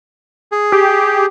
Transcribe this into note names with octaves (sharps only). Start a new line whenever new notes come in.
G#4
G4